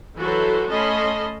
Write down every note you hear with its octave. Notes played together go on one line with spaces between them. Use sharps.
E3 F#3 F#4 A4 B4 C5
A3 C#4 D#5 A5 B5 C6